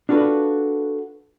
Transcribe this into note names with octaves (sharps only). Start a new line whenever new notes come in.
D4 F4 F#4 A4 B4